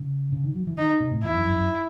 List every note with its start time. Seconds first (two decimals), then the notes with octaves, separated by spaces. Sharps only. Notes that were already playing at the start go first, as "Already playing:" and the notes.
Already playing: C#3
0.32 C#3
0.44 D#3
0.55 F#3
0.67 E3
0.77 D#3 D#4
1.00 C3
1.11 A2
1.23 E2 E4
1.34 F#2
1.45 F#2
1.56 F#2